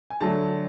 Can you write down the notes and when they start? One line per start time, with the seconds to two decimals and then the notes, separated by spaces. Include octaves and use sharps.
0.10 G#5
0.21 D3 F#3 A3 A5